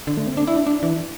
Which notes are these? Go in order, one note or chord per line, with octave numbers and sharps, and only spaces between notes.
D3
A3
C4
D4
E4
D4
D4
E3